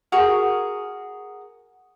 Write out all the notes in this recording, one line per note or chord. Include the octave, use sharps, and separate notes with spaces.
F#4 G#4 A#4